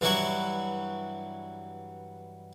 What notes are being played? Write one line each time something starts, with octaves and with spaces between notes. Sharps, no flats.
G2 E3 F#3 E4 F#4 C#6